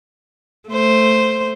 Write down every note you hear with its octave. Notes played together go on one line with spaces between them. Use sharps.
A3 C5